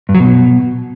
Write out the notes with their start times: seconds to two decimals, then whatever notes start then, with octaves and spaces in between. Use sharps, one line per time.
0.09 G2
0.15 F#3
0.20 B2